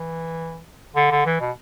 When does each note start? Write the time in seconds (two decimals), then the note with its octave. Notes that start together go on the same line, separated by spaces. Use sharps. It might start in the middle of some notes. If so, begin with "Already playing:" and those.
Already playing: E3
0.96 D3
1.11 D3
1.26 E3
1.41 B2